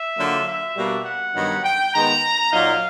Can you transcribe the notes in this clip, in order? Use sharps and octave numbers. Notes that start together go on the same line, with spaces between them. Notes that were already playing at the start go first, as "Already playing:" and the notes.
Already playing: E5
D3 F#3 A#3 D4 F4
E5
B2 G3 A#3 D4
F#5
G2 D#3 F#3 B3 D#4
G5
D#3 G#3 B3 A#5
A#2 F#3 A#3 D#4 F5